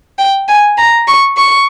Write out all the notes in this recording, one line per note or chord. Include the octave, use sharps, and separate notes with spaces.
G5
G#5
A#5
C#6
C#6